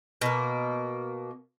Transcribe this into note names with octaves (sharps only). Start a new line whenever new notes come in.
B2 A#3